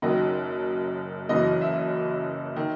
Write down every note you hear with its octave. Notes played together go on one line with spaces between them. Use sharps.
F#1 F#2 D#3 D#5
F#1 F#2 E3 D#5
E5
D#3